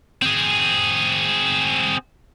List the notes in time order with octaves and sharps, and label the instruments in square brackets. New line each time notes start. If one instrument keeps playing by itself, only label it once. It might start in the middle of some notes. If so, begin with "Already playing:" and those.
[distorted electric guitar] C4 G#4